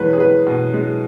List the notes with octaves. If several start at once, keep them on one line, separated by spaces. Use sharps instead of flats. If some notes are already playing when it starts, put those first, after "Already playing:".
Already playing: E2 B2 G#3 B4 C#5
G#4
E2 B4
B2
G#3